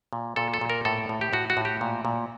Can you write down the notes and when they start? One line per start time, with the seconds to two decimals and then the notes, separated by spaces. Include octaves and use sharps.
0.13 A#2
0.36 A#2 A4
0.54 A4
0.61 A#2
0.70 A#4
0.85 A2 A4
1.09 A2
1.21 G4
1.33 A2 F#4
1.50 F#4
1.57 A2
1.65 G4
1.81 A#2
2.05 A#2